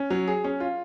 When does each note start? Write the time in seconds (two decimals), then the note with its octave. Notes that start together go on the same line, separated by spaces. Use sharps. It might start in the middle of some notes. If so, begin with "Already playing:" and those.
Already playing: C#4
0.10 F#3
0.28 G#4
0.44 C#4
0.60 F4